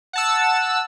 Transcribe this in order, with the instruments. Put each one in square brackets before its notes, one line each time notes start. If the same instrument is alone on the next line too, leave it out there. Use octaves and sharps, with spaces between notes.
[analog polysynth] F#5 A5 E6